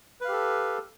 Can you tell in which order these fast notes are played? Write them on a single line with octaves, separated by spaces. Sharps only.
B4 F5 G4 A4